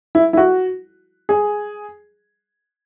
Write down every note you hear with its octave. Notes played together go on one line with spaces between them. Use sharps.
E4
E4
F#4
G#4